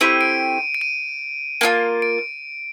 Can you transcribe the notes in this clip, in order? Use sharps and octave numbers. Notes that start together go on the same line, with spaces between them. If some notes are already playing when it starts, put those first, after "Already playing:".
A3 C4 E4 G4 D#7
D7
D7
D#7
A#3 D4 F4
D7